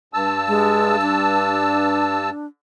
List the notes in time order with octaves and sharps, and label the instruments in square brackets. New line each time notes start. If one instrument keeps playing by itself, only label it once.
[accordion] G2 A5 E6
[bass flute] G#3
D4